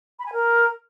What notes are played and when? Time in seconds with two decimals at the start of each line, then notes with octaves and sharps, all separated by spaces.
0.19 B5
0.26 G#5
0.32 A#4